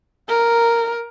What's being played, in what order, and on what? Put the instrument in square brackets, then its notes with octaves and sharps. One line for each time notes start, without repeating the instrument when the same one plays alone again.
[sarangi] A#4